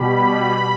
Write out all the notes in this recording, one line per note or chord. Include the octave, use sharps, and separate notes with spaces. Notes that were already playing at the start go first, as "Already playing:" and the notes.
Already playing: B2 G3 B5